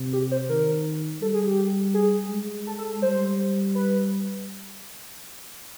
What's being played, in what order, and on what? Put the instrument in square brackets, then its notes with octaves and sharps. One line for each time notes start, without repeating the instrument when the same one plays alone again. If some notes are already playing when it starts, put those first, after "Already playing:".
Already playing: [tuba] C3
[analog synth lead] G4
C5
[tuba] D#3 [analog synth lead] A#4
[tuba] G3 [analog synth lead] A4
[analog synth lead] G#4
G4
G#4
[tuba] G#3
[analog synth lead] A4
A4
[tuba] G3 [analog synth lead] C5
[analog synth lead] B4